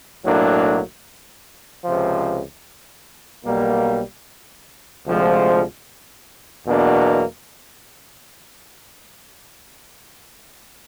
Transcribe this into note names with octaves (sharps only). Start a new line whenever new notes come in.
B1 A2 F#3 A#3 D4
C#2 C3 F3
B1 B2 G3 A#3
D2 C3 F3 G#3
E2 B2 F#3 A#3 D4